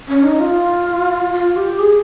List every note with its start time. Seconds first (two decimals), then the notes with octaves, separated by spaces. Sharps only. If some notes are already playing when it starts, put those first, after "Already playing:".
0.08 C#4
0.23 D#4
0.40 F4
1.32 F4
1.56 G4
1.79 G#4